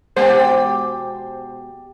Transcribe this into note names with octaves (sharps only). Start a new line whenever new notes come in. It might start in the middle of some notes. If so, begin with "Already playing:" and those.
B2 G#3 G4 C5 D5 F#5